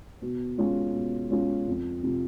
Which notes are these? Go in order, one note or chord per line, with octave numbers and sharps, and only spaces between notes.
B2
G#3 C#4 F4
B2
G#3 C#4 F4
F2
C3 F3